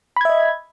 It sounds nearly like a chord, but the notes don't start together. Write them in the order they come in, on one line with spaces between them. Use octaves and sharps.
B5 G#6 E5 D#5